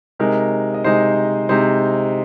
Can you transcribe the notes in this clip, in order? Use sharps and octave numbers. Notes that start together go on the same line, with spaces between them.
C3 G#3 D#4 A#4
D#5
C3 G#3 D#4 C5
C3 G#3 D#4 C5